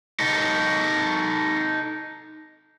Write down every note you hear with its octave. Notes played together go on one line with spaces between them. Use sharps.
D#4 A4